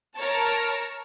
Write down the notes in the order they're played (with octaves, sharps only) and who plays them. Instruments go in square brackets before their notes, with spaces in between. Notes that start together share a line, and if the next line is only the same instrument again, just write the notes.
[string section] A#4 C#5 A5